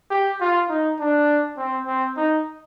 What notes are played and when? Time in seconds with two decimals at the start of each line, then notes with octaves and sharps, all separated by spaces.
0.11 G4
0.41 F4
0.69 D#4
0.99 D4
1.57 C4
1.86 C4
2.17 D#4